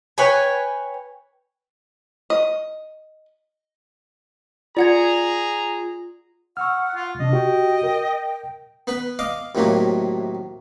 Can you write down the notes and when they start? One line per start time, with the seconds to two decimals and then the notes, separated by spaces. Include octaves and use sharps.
0.18 B4 C#5 G5 G#5
2.30 D#5
4.77 F4 G#4 D5 F#5 A#5 G#6
6.57 F#5 C#6 E6 F6
6.95 F4
7.20 C3 D4 D#5
7.33 F#4 G4 G5
7.83 A#4
8.87 B3 B4 B5
9.19 D#5 F5 D6
9.55 D#2 A2 C3 F#3 A#3